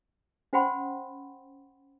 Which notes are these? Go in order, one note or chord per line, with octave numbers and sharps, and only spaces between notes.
C#4 C5 F#5 G5 B5 C6